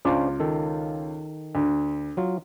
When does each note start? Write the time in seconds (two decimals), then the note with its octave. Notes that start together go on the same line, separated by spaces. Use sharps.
0.05 C#2 C#4 D4 F4 C5 D6
0.40 D#3 A4
1.55 D2
2.17 F#3 F4